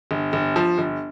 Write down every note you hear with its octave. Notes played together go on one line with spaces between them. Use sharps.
G1
G1
F3
G1